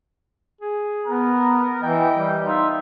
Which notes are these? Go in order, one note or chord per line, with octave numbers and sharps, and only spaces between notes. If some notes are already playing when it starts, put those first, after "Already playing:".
G#4
B3 A#4
E3 G4 D#5 G5
G3
D#4 F4 C5 E5